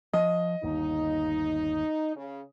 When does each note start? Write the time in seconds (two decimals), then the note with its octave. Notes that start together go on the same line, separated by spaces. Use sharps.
0.13 F3 D#5
0.63 G1 D#2 D#4
2.16 C#3